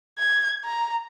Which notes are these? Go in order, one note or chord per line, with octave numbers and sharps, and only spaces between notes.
G#6
A#5